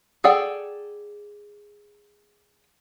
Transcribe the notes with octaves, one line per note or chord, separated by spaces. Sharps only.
G#4 A4 D5 F#5 G5